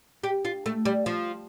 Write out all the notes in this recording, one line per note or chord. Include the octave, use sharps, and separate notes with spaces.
G4
F4
A3
G3
F3